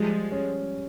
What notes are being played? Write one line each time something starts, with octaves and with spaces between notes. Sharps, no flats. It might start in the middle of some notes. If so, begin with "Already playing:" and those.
Already playing: F3 G3 G#3
C#4